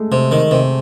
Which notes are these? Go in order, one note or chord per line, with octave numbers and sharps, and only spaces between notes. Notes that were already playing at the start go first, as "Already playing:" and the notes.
Already playing: G#3 A3
C3
D#3
C3